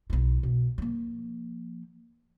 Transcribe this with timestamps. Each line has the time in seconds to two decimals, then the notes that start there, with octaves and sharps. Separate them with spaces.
0.10 B1 E4
0.43 B2
0.78 F3 A#3